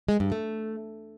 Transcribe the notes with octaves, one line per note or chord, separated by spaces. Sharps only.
G#3
G2
A3